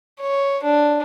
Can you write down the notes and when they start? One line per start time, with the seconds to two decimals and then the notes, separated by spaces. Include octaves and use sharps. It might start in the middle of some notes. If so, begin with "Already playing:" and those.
0.21 C#5
0.63 D4